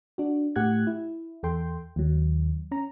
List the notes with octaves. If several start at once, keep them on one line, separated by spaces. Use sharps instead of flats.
D4 F#4
A2 G4 F#5 F#6 G#6
E4
E2 A4 G5 C6
D#2 F#3
C#4 A#5